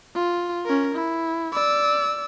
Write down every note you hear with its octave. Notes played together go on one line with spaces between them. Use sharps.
F4
C#4 A#4
E4
D5 E6